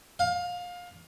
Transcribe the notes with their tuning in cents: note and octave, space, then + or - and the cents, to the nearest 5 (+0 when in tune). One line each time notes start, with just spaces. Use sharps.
F5 +25